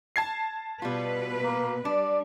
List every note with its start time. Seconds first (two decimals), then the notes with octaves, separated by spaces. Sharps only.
0.16 A5 G#6 C7
0.82 B2 G3 F4 B4
1.43 A#3
1.85 G3 D4 D5